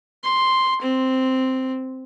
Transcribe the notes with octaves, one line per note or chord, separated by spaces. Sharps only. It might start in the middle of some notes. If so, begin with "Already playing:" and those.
C6
C4